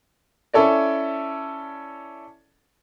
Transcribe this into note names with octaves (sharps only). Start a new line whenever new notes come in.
C#4 E4 A4 C#5 D5